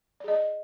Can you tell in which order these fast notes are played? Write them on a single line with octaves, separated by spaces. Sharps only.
D5 G#4 D#5